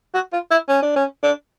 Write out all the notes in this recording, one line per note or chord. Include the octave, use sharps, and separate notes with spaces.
F#4
F4
E4
C#4
D4
C#4
D4